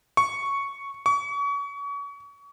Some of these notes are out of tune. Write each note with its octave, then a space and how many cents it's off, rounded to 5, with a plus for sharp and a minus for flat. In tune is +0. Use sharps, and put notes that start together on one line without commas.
C#6 +0
C#6 +35